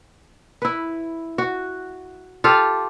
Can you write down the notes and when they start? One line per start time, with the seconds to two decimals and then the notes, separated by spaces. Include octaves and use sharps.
0.62 E4 B4
1.38 F#4
2.44 F4 G4 A4 F5